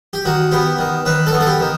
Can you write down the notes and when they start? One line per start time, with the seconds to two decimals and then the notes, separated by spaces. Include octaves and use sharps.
0.13 G4
0.25 D#3 F#4
0.52 B3 G4
0.79 D#3
1.05 D#3 B4
1.27 A4
1.32 B3
1.41 A4
1.46 G4
1.60 D#3